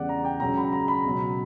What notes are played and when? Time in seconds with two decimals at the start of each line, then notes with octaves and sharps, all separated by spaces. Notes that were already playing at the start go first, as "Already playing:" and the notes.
Already playing: E2 C#3 E3 G3 D5 F#5
0.09 A#5
0.25 G5
0.40 C#2 C#3 F#3 A#5
0.57 B5
0.73 A#5
0.88 B5
1.05 C#2 B2 F#3